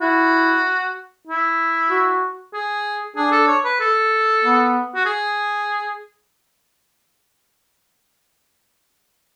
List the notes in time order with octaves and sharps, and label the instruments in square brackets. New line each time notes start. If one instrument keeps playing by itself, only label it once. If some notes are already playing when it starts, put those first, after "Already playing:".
[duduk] E4 [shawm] F#4
[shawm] E4
[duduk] F#4
[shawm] G#4
[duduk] D4 [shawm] G#4
[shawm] A4
C#5
B4
A4
[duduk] B3
[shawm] F#4
G#4